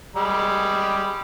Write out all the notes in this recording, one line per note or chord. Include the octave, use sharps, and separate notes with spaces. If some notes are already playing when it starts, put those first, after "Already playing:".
G3 G#3 B5